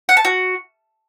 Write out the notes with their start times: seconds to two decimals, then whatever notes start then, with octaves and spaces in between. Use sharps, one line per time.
0.09 F#5
0.17 A5
0.25 F#4